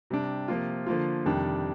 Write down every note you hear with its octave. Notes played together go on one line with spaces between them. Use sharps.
C3 G3 D4
C3 F3 A#3 F4
D3 F3 A#3 F4
F2 C3 D#3 G3 D4